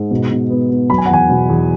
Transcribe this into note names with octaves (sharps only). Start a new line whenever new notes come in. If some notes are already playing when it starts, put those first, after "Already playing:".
Already playing: G#2
B2
B2
B3
B3
F#3 B5
G#5
F#5
E2 G#5
B2
E2